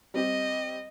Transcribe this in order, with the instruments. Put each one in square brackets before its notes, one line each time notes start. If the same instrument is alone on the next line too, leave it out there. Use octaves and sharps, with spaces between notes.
[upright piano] G3 C4 G4 [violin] D#5